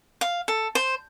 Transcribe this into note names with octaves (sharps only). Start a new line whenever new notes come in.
F5
A4
C5